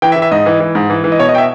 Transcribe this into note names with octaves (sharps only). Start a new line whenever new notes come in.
E3 G5
E5
E3
E5
G#2 D#5
E3
E3
G#2
E3
E3
D#5
B2 C#5
D#5
G5
E5